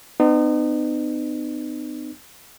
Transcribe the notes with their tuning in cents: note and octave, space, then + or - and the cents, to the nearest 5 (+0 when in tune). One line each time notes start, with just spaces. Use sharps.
B3 +40 D#4 -40